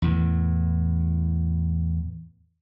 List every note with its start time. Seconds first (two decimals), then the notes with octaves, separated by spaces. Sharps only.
0.02 E2 A2 E3